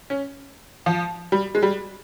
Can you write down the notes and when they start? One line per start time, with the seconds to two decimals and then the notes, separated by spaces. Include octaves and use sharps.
0.10 C#4
0.86 F3
1.32 G3
1.55 G#3
1.63 G3